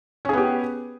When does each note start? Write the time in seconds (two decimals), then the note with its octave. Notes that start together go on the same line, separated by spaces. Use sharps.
0.25 C#4
0.29 G#4
0.33 B3
0.37 G4